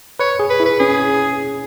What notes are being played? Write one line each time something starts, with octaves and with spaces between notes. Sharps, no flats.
B4 C#5
G#4
B4
E4
B4
C#4 G#4